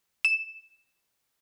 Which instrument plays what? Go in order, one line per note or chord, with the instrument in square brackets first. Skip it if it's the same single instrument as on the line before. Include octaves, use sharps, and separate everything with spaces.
[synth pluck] E7